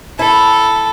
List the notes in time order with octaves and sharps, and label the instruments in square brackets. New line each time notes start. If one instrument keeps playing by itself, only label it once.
[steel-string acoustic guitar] E4 [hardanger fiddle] A4